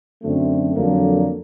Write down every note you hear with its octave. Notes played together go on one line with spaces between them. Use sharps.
F#2 D3 F#3 A3 C4
F2 D3 F#3 A#3 D4